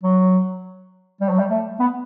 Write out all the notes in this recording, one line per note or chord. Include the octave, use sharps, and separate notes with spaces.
F#3
G3
F#3
G3
A3
B3